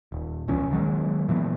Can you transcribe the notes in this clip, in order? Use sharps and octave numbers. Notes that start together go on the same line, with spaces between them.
D#1
E1 C#2 F3 C#4
D#3 F#3 G#3
A#2 E3 B3